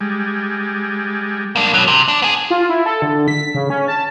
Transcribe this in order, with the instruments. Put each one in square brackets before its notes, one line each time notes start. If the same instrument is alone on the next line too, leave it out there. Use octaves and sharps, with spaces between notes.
[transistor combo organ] G3 G#3
[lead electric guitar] A#3 D4
B2 F#3
C3
D4
B3 G#4
[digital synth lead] F4
E4
A4
D3
B6
C#3
C#4
A5